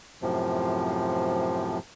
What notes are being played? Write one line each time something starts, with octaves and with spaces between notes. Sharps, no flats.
F#2 A2 C3 F3